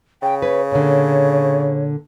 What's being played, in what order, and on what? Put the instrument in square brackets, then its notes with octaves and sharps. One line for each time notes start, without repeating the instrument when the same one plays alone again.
[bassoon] C#3 [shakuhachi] G5
[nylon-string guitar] B4 [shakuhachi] C#5
[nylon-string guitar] A#2 D3 [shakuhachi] C#5